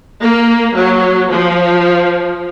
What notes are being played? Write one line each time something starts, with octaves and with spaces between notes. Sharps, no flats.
A#3
F#3
F3